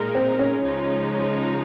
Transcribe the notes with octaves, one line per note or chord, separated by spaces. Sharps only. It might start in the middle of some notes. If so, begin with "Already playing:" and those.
Already playing: A#2 G#3 D#4 A#4
C4
C#4
C#2 C#3 F3 G#3 D#4